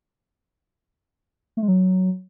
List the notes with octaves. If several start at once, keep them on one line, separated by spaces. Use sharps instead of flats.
A3
G#3
F#3